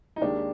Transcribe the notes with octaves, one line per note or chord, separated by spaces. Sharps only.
D#4
D#2 D#3 G#3 D4